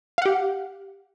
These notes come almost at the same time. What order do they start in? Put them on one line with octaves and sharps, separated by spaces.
F5 F#5 G4